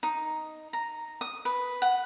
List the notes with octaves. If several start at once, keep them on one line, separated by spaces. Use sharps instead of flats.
D#4
A#5
D#6
B4
F#5